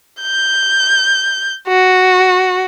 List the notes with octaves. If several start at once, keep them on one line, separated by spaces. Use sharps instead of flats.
G6
F#4